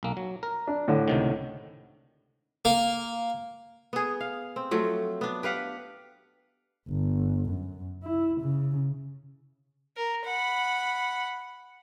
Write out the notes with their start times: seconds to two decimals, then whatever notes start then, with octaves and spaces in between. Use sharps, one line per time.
0.03 B1 A#3
0.17 F#3
0.43 A#4
0.67 D4
0.88 A2 D3
1.08 C#2 C3 D#3
2.65 A#3
3.93 B3 G#4
4.20 F5
4.56 C4
4.71 F3 F#3 A3
5.21 B3 D4
5.43 G4 B4 F5 F#5
6.89 G1
7.50 F#2
8.03 E4
8.42 C#3
9.97 A#4
10.25 F#5 B5